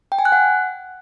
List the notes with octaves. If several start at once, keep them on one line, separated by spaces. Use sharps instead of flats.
G5
G#5
F#6
F#5